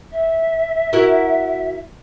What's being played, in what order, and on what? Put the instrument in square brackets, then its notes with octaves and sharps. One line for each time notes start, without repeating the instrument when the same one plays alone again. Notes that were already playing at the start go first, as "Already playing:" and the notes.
[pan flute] E5
[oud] E4 F#4 A#4